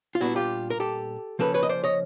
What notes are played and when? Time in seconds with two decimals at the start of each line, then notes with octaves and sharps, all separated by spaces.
0.15 F4
0.21 A#2 G3 B3 D4 E4 F#4
0.36 F4 G4
0.70 A#4
0.80 G4 A4
1.39 C#3 F3 A#3 C#4 A4 B4
1.54 B4 C#5
1.63 D#5
1.69 C5 D5
1.84 C#5 D#5